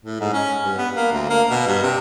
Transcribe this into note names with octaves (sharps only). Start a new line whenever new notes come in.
A2
G#2
C#4
G2
B3
A#3
D2
A#3
B2
G2
C3